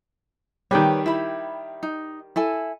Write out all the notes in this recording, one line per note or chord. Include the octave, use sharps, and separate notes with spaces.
D#3 G3 G4 B4 C#5
E4 B5
D#4
E4 A4 G#5